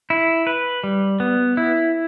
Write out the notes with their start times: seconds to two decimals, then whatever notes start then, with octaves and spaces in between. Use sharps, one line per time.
0.10 E4
0.47 B4
0.84 G3
1.20 B3
1.57 E4